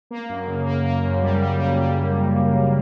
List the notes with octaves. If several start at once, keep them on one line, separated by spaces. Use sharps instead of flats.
A#3
F#2
C#3
A#3
A#3
F#2
G3
G3
G3
G3